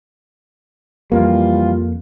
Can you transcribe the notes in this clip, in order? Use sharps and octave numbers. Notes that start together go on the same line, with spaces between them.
F2 E3 G3 A#3 F4